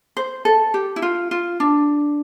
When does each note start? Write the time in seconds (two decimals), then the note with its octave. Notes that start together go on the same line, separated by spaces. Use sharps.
0.17 C5
0.45 A4
0.74 G4
0.96 E4
1.02 F4
1.31 F4
1.60 D4